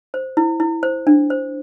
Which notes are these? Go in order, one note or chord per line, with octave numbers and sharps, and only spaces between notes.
C5
E4
E4
C5
D4
C5